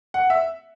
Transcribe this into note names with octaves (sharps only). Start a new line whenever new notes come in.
F#5
E5